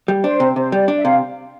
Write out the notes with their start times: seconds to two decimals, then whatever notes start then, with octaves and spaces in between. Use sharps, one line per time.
0.08 G3
0.24 D4 C5
0.40 C3
0.56 C3 C5
0.72 G3 D5
0.88 D4
0.97 E5
1.04 C3 F5